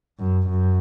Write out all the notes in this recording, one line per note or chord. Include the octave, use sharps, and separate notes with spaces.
F#2
F#2